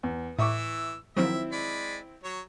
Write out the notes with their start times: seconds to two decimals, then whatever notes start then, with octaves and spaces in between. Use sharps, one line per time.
0.03 E2
0.39 A2 E3 E5 C#6 D6 E6
1.17 D#3 F3 F#3 C4 E4 E5
1.52 G#3 D5 B5
2.24 F#3 C#5